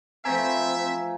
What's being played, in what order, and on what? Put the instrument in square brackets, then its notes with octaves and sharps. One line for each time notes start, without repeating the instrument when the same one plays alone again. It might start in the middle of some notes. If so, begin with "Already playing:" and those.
[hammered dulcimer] E3 F3 A3 [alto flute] C4 [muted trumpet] E5 [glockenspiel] G#5 A#5 G#6